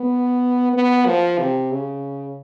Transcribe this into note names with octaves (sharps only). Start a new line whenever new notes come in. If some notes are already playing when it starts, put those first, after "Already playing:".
Already playing: B3
B3
F3
C3
C#3